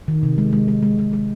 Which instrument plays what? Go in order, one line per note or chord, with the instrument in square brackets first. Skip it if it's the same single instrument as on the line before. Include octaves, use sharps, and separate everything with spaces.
[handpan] D#3
C3
G#3
G#3
G#3
G#3
G#3
G#3